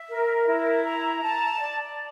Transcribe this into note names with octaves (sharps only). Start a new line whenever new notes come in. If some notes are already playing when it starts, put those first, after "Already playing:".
Already playing: E5
A#4
E4
A#5
A5
D5